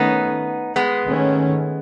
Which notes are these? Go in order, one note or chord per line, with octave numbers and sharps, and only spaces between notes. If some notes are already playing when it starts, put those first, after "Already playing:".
Already playing: D#3 A3 B3 C#4 D#4
G#3 B3
D#3 A3 C#4